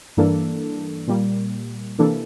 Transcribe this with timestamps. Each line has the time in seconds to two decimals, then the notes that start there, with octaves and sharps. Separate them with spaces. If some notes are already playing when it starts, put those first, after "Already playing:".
0.17 G2 E3 A#3 D4 A4
1.07 A#2 G3 A#3
1.99 C3 E3 A#3 D4 A4